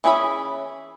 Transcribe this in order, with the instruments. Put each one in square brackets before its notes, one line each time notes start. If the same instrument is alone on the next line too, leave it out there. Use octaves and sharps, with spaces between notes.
[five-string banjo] E3 C#4 G#4 E5 B5